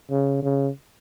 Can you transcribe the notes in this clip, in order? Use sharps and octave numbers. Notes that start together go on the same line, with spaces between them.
C#3
C#3